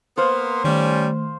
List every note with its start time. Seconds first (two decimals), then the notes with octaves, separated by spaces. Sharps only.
0.17 A#3 B3 C5 F5
0.64 D#3 G3 A3 C#4